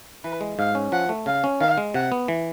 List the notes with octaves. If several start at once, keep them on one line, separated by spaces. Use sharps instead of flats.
E3 B4
G#3
G#2 F5
C#4
F3 F#5
A3
C#3 F5
C#4
D#3 F5
G#3
C3 F#5
B3
E3